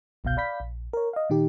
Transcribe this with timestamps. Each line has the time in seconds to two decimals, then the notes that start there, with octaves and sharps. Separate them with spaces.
0.24 G1 C2 B2 F5 G6
0.37 D5 F5 B5 G6 B6
0.60 A#1
0.93 A#4 C#5
1.13 D#5 F5
1.30 A#2 D#3 D#4 G4